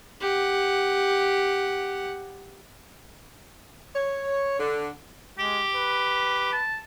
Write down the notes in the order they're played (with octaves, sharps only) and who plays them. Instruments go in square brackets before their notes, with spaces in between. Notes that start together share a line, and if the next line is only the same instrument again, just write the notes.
[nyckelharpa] G4 F#5
[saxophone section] C#5
D3
[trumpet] G#3 [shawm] G4
[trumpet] B4
[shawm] A5